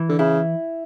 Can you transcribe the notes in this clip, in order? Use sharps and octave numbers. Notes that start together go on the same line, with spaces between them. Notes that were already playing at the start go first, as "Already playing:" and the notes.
Already playing: E3
D3
C#3 E4